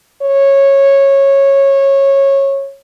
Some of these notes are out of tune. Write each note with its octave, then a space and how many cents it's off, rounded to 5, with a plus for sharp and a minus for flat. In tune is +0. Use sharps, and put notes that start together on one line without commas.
C#5 -15